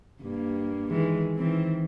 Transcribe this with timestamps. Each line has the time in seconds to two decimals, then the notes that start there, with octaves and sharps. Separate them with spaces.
0.22 G2 A#3
0.90 D#3 E3 G#3
1.36 D#3 E3 C4